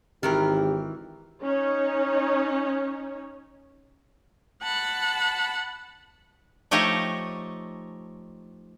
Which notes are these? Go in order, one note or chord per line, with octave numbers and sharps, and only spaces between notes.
G#1 D#3 E3 G4 A#4
C#4 D#4 C#5
F#5 A5 B5
F3 A3 D#4 G4 C#5 D#5